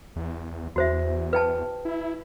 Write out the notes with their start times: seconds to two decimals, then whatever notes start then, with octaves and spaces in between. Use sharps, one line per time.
0.16 E2
0.76 E2 F#4 C5 E5
1.33 B4 G5 A5
1.85 E4